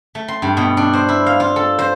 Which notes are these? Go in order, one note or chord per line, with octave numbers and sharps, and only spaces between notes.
A3
C6
G2
B2
D4
C5
E4
F5
F4
A4
C5